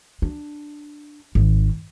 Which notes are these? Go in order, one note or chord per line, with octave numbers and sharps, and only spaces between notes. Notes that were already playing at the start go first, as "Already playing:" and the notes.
D4
G#1